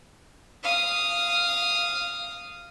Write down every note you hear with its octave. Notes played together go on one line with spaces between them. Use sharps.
F5 D#6